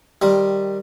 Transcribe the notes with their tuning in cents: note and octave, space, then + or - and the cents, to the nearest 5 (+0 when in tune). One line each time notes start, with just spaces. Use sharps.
D#3 +0 G3 +0 C5 +0